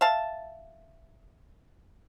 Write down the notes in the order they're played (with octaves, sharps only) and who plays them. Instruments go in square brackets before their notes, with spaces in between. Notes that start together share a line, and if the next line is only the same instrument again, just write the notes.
[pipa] E5 F5 A5